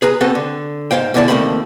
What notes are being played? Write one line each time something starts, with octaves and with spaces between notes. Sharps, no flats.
G#4 B4 A#5
B3 C4 F#4 A4 B4 C5
D3
G#2 C5 F5 G5
E2 B2 D3 E4 D5 A5
D#2 F3 A3 A#3 C4 B5